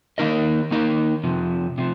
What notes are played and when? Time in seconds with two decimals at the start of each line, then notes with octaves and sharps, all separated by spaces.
0.18 D#3 A#3 D#4 A#4 D#5
0.71 D#3 A#3 D#4 A#4 D#5
1.24 F2 C3 F3
1.78 C3 F3